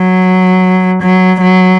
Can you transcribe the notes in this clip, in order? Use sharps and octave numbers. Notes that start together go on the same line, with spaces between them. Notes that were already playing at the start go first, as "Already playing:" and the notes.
Already playing: F#3
F#3
F#3